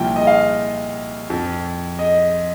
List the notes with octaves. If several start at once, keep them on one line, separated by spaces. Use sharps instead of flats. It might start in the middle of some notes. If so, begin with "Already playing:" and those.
Already playing: C2 A#2 F3 G5
D#5
F5
F2 F3
D#5